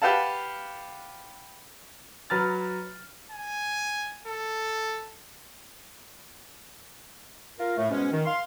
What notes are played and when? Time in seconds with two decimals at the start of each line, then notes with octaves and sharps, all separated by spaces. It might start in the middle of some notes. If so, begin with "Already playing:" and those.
0.02 G4 B4 F5 F#5 A5
2.30 F#3 B4 A#5 F6 A6
3.31 G#5
4.27 A4
7.60 F4 A#4
7.77 A2 A3
7.91 G#2 B2 G#3 B3 C#4
8.12 D#3
8.26 F5 C6